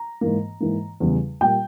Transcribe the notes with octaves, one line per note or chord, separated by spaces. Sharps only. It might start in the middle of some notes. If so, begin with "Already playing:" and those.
Already playing: A#5
G#2 E3 A#3
G#2 E3 A#3
E2 C#3 G3
A#2 G3 A#3 G5